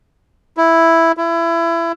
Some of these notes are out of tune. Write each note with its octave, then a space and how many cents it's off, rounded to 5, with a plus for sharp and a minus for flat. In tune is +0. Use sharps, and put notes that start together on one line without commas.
E4 +0
E4 +25